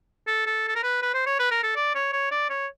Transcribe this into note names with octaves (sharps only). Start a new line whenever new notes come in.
A4
A4
A4
A#4
B4
B4
C5
C#5
B4
A#4
A4
D5
C#5
C#5
D5
C#5